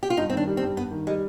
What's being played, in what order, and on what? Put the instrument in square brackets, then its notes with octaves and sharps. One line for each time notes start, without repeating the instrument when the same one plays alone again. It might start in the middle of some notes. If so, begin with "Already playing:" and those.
[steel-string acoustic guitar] G4
F4
[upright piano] G2 [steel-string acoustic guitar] D#4
[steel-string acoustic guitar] C4
[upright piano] D#3 [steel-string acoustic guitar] D4
[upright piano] G3
[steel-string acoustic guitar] C4
[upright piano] G2
[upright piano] G2 [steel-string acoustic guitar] B3
[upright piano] D#3
[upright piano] G3 [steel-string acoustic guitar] G#3